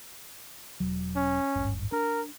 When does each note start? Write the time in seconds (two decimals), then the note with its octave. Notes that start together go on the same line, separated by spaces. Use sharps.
0.80 E1 F#3
1.17 C#4
1.55 D1 G#1 G2
1.92 D4 A#4